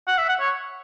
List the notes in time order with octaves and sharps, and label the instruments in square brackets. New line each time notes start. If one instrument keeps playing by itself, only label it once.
[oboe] F#5
E5
F#5
C#5